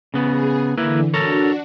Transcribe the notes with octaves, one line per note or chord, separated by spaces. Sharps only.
C#3 B3 G#4
D3 E3 A#3 E4 B4
D4 F#4 A4 A#4 C#5